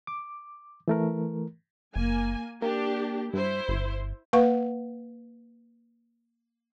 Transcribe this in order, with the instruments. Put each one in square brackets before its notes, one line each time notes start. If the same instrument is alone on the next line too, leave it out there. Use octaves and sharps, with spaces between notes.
[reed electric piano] D6
E3 A3 A#4
[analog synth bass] F#1 [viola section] A#3 G#5
[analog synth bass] A#3 [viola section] D4 G4
[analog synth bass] G2 [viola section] E4 C5
[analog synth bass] G1
[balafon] A#3 B4 F5 F#5 C#6